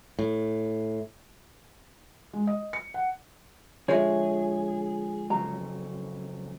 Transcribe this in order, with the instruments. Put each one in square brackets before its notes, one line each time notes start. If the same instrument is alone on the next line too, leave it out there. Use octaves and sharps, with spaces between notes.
[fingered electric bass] A2
[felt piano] G#3
D#5
C#7
F#5
[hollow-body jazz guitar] D3 F3 G#3 [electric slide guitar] G#4 [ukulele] C#5 E5
[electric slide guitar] F2 C#3 F#3 [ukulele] A#5